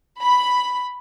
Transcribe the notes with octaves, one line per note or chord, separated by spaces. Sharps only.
B5